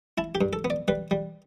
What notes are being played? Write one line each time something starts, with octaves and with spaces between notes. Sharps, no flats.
E4 A5
G4
G2
A4
B3
D5
G3 B4
G3